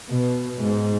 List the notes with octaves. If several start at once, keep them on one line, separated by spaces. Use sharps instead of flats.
B2
G#2